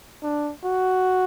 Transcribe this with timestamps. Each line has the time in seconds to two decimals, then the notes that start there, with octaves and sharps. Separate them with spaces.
0.22 D4
0.64 F#4